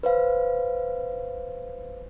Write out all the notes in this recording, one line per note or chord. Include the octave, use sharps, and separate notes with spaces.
B4 C5 F5